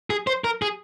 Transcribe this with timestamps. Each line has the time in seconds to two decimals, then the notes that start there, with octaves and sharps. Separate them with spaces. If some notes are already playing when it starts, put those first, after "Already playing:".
0.10 G#4
0.27 C5
0.44 A#4
0.62 G#4